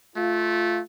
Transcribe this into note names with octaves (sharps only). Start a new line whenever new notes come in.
A3 F4